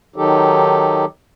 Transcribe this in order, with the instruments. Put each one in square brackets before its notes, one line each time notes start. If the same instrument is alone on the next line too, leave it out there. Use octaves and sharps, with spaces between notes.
[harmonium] D#3 F#3 D#4 G4 A4